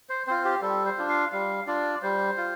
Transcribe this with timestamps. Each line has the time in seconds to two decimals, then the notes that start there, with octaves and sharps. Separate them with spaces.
0.09 C5
0.27 C4 F4 C5
0.45 G4
0.62 G3 A4
0.86 C5
0.97 D4 F4
1.09 F5
1.32 G3 F5
1.67 D4 F4 D5
2.02 G3 C5
2.37 F4